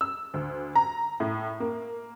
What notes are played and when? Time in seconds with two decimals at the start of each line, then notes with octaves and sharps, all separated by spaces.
0.01 E6
0.34 D2
0.75 A#5
1.20 A2
1.60 A#3